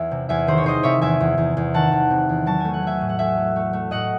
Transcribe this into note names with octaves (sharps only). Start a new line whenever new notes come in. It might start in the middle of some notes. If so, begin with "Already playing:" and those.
Already playing: E2 E5 G#5
C3
E2 E5 G#5
D#3 G#4 C5
C#5
C3 C5 D#5
C3 C#5 E5
E2 E5 G#5
E2
E2
E2
D#3 F#5 A5
E2
C3
E2
F#3 A5
A3 G#5
F#5
A3 E5 G#5
A2
F#5
A3 E5 G#5
A3
A3
A3
A2 D#5 F#5